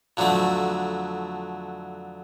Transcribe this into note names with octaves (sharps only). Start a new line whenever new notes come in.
F2 D3 F#3 A3